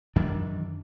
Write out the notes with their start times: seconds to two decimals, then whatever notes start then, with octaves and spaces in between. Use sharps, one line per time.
0.16 F#2 D#3 E3 D4